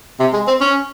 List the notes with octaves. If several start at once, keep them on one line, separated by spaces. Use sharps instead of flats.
C3
G#3
C4
C#4